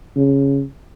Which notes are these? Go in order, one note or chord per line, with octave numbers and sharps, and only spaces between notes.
C#3